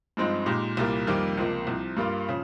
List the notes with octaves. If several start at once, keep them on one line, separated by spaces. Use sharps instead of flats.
G2 F3 G#3 C4 D#4
A#2 G#3 D#4 G4
C2 A#2 G3 A#3
F2 C3 D#3 G3 A#3
C#2 C3 F3 A#3
C2 C3 F3
G2 G3 A#3 F4
C#3 F3